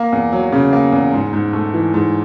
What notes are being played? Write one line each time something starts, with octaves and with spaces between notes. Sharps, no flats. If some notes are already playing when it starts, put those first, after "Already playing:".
Already playing: A#3
E2
F#3
C#3
A#3
E2
G#2
G#2
A3
E3
G#2